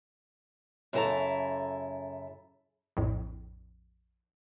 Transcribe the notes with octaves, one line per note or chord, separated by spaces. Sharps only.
F#2 C#3 E4 G#4 A4 A#5
A#1 F2 A2